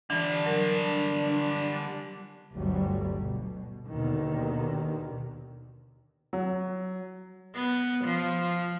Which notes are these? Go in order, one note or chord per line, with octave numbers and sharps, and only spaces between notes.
D3 E3 G3 D4
F#3 A#4
G1 D2 F#3 G3
B2
D#2 B2 D3 D#3
F#3
B3
F3